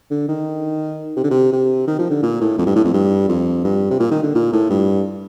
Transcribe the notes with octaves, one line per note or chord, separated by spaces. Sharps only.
D3
D#3
C3
D3
C3
C3
D#3
F3
D3
A#2
A2
F2
G2
A2
F2
G2
F2
G2
C3
A#2
D#3
D3
A#2
A2
G2